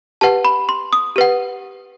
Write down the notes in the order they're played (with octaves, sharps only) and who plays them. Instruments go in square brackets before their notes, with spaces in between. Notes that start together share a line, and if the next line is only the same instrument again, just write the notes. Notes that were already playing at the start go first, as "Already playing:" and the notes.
[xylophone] G4 B4 F#5 A5
B5
C6
D#6
G4 B4 F#5